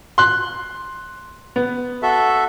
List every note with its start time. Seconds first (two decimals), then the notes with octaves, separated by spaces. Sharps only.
0.18 C6 F#6
1.56 B3
2.03 F#4 A4 E5